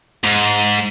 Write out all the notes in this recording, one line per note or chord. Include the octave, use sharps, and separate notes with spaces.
G#2